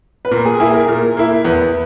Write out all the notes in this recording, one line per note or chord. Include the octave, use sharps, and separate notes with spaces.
B4
A#2 A#4
G#4
A#3 E4 G#4
A#4
A#2 A#4
A#3 E4
E2 B4